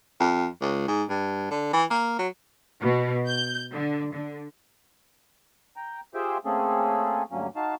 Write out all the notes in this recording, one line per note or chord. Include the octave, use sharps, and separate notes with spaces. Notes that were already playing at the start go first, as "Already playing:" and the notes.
F2
C#2
G#2
G2
D3
E3
A#3
F#3
B2
G6
D3
D3
G5 A#5
F4 G4 G#4 C5 E5 G5
A3 A#3 C4 C#4 G#4 A4
D2 G2 F#3 A#3 C#4
D#4 F#4 F5 A5